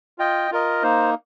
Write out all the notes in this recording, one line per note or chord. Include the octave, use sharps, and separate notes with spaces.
F4 D#5 G5
F4 A#4 D#5
A#3 D#4 C5